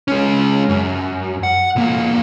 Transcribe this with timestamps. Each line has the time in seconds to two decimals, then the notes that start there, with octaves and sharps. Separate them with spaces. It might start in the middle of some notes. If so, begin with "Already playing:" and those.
0.08 G#3 C#4
0.69 F#2
1.43 F#5
1.76 B1 A#3